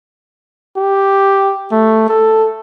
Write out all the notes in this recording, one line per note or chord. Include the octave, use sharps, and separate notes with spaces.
G4
A3
A4